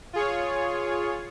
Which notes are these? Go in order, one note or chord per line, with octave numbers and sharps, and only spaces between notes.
F4 G#4 C#5